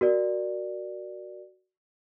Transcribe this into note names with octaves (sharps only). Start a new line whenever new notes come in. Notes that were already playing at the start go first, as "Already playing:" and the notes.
F#4 A#4 D5